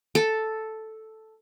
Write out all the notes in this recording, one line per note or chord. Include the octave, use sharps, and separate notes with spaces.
A4